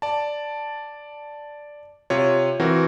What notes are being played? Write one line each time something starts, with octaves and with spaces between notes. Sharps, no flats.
D5 A5
C3 F4 C#5
E3 C4 F#4 A#4